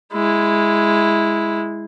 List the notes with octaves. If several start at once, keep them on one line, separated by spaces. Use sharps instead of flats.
G#3 E4